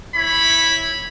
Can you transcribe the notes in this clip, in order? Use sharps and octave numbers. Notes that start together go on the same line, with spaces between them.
E4 C#5 B5